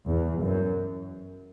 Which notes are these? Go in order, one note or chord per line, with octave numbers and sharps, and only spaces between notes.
E2
F#2